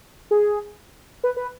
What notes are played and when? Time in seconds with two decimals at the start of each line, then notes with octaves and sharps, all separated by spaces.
0.31 G#4
1.24 B4
1.37 B4